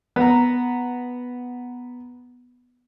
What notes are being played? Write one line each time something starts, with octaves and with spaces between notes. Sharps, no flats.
B3 A#5